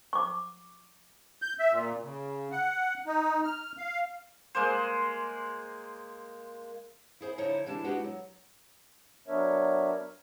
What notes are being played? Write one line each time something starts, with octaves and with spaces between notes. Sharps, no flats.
C#6 D6
G6
E5
A#2
C#3
F#5
D#4
F6
F5
G#3 A#3 C5
E4 G#4 C5
D3 F3 D#4 E4 C#5 A#5
E3 G#3 D4 G4 A5
G#3 B3 D4 D#4 F#4 G4
F#3
F#3 B3 D4 A#4 C#5 E5